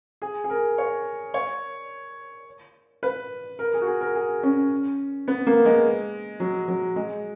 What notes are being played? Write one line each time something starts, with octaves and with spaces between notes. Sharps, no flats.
G#4
G#4
A#4
C#5
C#5
B4
A#4
G#4
F#4
G#4
A#4
G#4
C#4
B3
A#3
G#3
F#3
F#3
G#3